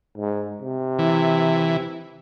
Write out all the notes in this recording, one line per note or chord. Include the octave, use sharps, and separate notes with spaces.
G#2
C3
E3